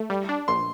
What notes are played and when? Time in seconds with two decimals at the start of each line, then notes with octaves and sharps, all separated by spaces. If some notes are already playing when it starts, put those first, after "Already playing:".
Already playing: A3
0.10 G3
0.29 D4
0.48 A#1 C6